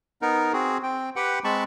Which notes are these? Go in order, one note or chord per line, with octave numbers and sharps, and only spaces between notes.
B3 D#4 A#4
C4 F#4 G#4
C4 G5
G4 B4 F#5 G5
G#3 C4 A5 B5 C#6